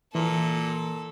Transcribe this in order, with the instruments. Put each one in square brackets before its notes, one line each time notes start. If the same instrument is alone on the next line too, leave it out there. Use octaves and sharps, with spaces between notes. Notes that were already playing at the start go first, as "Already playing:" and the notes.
[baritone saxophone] A#2 [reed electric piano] E3 [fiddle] A4